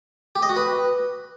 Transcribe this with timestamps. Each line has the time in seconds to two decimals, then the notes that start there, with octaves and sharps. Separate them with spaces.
0.36 G4
0.42 D#5
0.49 F#4
0.56 B4